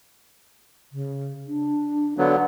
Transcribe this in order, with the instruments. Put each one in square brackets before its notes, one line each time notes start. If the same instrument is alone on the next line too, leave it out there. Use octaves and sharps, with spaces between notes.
[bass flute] C#3
D4
[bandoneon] D3 F#3 B3 [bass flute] F5